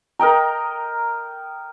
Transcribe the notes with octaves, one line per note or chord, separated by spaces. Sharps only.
A#4 D#5 G5 A#5